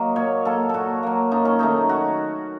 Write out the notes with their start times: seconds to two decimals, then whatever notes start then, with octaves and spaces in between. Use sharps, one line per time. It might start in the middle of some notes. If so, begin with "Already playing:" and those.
Already playing: F#3 A#3 D#5
0.16 A#2 C#5
0.45 F#3 A#3 A4
0.69 A#2 F#4 A4
1.03 F#3 A#3
1.32 F#2 D#4
1.45 C#4
1.59 D#3 A3 D#4
1.89 F#4